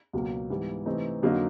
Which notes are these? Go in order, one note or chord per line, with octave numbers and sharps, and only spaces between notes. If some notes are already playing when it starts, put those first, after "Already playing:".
C#2 B2 F#3 A#3
G#2 E3 G3 B3
C3 E3 A3 C4 D#4
F2 D3 F#3 A#3 D#4